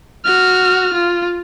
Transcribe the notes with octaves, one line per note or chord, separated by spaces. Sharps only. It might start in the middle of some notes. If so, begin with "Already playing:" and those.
F#4 F6
F4